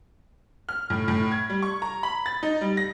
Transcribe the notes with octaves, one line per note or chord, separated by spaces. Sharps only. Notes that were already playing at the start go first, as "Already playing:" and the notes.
F6
A2
A2
G#6
G3
C#6
A#5
B5
A6
D#4
G3
A#6